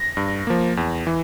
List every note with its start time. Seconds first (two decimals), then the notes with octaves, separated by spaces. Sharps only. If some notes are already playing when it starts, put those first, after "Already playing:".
Already playing: A#6
0.17 G2
0.47 F3 A#3
0.77 E2
1.07 E3